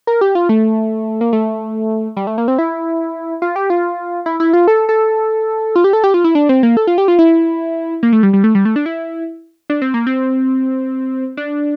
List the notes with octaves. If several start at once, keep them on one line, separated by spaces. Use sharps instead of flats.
A#4
G4
F4
A3
A#3
A3
G3
A3
A#3
C4
E4
F4
G4
F4
E4
E4
F4
A4
A4
F4
G4
A4
G4
F4
E4
D4
C4
A#3
A4
F4
G4
F4
E4
A#3
A3
G3
G3
A3
G3
A3
D4
E4
D4
C4
A#3
C4
D4